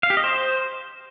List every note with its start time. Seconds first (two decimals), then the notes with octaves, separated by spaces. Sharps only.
0.03 F5
0.10 G4
0.17 D#5
0.24 C5